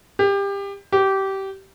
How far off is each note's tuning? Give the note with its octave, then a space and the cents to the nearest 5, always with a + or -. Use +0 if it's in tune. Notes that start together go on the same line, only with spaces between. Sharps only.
G4 +25
G4 -20